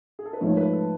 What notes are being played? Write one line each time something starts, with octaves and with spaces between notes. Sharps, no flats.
G#4
A4
B4
G#2 F3 A3 C#5
B4
A4